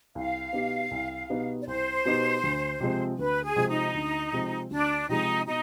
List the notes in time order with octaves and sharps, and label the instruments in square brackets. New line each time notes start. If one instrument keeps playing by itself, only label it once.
[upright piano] C2 [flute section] F5
[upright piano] B2 B3 D#4 G4
C2
B2 B3 D#4 G4
[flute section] D5
[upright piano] C2 [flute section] C5
[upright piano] B2 B3 D#4 G4
D2
C3 F3 G#3 C4
[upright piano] D2 [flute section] B4
[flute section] G#4
[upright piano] C3 F3 G#3 C4
[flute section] D#4
[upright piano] D2
C3 F3 G#3 C4
[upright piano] D2 [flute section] D4
[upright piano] C3 F3 G#3 C4 [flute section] D#4
[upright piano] B2 [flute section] D#4